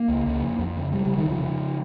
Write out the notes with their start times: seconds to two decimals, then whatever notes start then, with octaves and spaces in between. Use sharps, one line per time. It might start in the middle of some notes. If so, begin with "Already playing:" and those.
Already playing: A#3
0.08 C#2
0.26 C#2
0.42 F2
0.59 F2
0.76 C#3
0.92 C#3 G3
1.05 G3
1.10 F1
1.18 D#3
1.26 C#3 F3
1.43 C#3